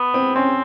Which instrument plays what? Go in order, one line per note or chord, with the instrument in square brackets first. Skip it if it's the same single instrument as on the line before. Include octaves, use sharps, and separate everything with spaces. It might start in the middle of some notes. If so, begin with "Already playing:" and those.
Already playing: [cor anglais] B3
[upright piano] C4
[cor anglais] C4 [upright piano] C#4